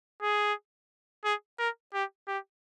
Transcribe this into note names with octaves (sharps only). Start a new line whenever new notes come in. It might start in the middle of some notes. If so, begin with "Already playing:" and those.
G#4
G#4
A#4
G4
G4